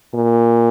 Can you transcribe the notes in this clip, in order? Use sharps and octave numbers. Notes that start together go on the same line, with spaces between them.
A#2